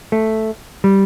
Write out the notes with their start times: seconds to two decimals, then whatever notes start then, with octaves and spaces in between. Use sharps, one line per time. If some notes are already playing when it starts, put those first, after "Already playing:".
0.12 A3
0.84 G3